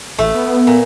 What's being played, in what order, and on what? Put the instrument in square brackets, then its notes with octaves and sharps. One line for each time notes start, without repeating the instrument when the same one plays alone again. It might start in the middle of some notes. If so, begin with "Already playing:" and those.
[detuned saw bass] A1 [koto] A3
[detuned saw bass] B3
[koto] A#2